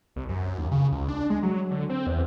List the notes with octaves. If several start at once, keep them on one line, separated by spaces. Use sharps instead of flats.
C2
F#2
D#2
C#3
C#2
D4
G#3
F#3
D3
C4
E2